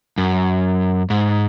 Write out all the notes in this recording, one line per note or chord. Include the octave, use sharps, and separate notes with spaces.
F#2
G#2